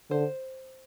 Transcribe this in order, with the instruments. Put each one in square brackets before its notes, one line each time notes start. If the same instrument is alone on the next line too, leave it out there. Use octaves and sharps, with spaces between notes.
[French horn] D3 [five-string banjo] C5